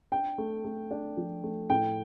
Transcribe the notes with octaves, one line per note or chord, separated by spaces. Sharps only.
D4 G5
A3
A3
D4
F3
A3
A2 G5